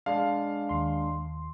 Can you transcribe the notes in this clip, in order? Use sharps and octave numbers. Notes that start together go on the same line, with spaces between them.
G#3 D4 F5
D#2 C6